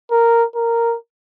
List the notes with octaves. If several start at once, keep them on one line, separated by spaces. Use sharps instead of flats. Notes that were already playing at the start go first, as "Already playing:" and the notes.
A#4
A#4